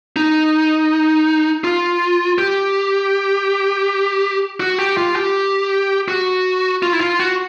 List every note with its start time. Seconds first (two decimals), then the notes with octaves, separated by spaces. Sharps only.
0.16 D#4
1.64 F4
2.38 G4
4.60 F#4
4.79 G4
4.97 F4
5.16 G4
6.08 F#4
6.83 F4
6.93 E4
7.01 F4
7.19 F#4